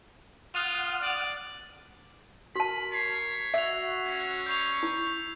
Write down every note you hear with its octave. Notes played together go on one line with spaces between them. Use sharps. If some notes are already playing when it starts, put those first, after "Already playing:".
F4 F#5 D#6 F6
D5
F#4 A#4 A5 B5
C#5 B6 C7
F#4 E5 E6 G#6 F7
C#4
D5 B5 C#6 G6 C7 F7
E4